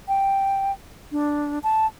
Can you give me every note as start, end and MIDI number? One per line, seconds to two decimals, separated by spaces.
0.08 0.72 79
1.12 1.59 62
1.63 1.86 81